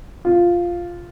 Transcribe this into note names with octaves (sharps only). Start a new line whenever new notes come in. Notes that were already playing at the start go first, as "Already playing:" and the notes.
F4